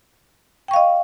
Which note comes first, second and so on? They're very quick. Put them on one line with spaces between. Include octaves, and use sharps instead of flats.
G5 C#6 F5 D#5